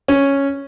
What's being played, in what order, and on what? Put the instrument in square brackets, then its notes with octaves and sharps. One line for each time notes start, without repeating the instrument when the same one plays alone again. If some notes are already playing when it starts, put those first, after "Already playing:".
[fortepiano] C#4